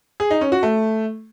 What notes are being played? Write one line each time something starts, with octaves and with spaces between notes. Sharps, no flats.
G#4
D#4
C#4
F#4
A3